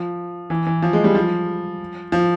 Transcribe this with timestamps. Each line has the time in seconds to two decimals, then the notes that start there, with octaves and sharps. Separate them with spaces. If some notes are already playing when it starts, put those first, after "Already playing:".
Already playing: F3
0.50 E3
0.66 E3
0.82 F3
0.93 G#3
1.04 G3
1.15 F3
2.12 F3